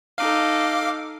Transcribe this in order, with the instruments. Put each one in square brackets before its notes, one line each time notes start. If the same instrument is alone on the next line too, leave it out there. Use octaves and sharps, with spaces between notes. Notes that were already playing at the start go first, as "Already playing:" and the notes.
[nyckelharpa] D#4 A4 [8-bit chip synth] F5 D6